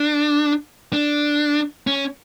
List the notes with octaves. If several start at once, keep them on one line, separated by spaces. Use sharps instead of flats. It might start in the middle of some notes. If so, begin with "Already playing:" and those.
Already playing: D4
D4
C#4